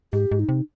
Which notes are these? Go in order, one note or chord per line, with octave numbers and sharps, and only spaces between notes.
G#2 G4
G#2
D#4
C3